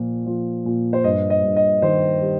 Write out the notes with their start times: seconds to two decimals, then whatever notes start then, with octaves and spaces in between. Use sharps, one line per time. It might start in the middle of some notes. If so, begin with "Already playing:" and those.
Already playing: A#2 F3
0.26 F3
0.65 A#2
0.93 C5
1.04 G2 D#5
1.30 D#5
1.43 G2
1.56 D#5
1.82 D#3 C5
2.21 G3